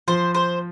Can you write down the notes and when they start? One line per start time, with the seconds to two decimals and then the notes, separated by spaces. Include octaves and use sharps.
0.08 F3 C5
0.35 C5